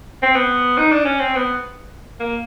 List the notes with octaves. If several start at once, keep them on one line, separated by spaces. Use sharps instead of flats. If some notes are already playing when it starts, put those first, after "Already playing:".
C4
B3
D#4
D4
C#4
C4
B3
A#3